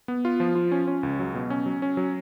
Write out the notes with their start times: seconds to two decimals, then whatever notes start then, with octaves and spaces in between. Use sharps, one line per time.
0.08 B3
0.25 F4
0.40 F3
0.55 F4
0.72 C#4
0.88 C#4
1.03 C#2
1.19 F#3
1.35 B2
1.50 C#4
1.66 F#3
1.82 C#4
1.97 F#3